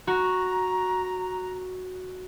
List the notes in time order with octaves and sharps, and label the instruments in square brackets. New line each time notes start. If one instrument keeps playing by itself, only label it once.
[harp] F#4 [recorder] A#5